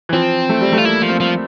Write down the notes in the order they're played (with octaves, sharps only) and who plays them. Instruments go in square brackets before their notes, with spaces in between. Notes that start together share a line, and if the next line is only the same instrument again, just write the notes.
[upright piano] E3
[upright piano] F3 [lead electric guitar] C4
[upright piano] A3
G3
A3
[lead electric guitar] F4
[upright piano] A#3 [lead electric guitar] E4
[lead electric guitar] F3
[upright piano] C4
[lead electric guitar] F3